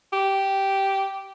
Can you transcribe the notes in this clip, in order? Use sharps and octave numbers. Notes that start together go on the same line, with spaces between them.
G4